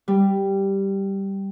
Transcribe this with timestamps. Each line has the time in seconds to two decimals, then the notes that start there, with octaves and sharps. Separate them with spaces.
0.08 G3